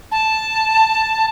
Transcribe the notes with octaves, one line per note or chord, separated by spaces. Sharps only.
A5